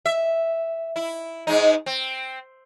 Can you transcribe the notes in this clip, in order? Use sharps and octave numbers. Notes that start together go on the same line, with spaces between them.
E5
E4
G#2 G#3 D#4
C4